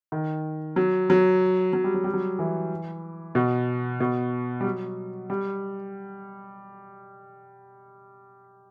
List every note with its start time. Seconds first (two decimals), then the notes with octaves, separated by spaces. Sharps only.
0.12 D#3
0.76 F#3
1.10 F#3
1.73 F#3
1.84 G3
1.94 F#3
2.04 G3
2.14 F#3
2.39 E3
3.35 B2
4.00 B2
4.61 G3
4.65 F#3
5.30 G3